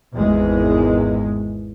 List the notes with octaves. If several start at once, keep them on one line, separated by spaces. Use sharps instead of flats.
G#1 E2 G#3